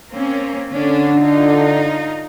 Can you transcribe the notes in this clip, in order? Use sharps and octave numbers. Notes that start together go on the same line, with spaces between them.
A#3 C4 C#4
D3 C#4 D4
D#4 F4